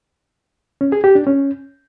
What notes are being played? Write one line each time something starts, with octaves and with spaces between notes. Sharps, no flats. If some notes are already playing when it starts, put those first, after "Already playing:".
C#4
G#4
G4
D4
C#4